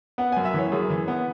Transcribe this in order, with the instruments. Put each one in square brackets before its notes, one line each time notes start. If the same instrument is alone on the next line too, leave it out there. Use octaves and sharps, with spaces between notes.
[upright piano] B3 F#5
F#2 G#5
E5
E3 C#5
F#2 G#4
E3
B3